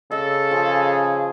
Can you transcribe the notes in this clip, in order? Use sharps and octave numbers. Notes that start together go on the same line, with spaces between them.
C#3 A4 D#5
F3 G#4